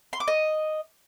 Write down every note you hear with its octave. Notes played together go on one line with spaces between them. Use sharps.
C6
D6
D#5